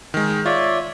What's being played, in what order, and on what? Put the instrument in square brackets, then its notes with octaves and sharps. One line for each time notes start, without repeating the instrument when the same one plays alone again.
[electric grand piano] D#3 G#3
[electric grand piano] F4 [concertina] C#5 D5 E5